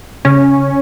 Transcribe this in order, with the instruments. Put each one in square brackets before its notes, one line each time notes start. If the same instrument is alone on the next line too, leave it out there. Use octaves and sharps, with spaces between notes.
[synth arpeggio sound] C#3 C#4